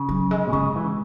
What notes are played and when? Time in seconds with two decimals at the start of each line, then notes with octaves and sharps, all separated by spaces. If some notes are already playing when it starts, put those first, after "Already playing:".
Already playing: C#3
0.09 F#3
0.31 G#3
0.47 B2
0.52 C#3 G#3
0.76 E3